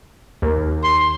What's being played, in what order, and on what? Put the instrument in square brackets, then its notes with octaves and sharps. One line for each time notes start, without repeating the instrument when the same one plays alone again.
[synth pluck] D#2
[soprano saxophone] C6